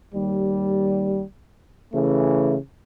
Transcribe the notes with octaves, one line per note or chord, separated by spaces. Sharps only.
D#2 G3
C#3 E3 A3